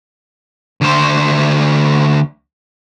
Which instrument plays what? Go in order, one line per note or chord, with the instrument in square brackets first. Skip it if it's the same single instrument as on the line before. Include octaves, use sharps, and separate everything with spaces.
[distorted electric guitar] D2 C5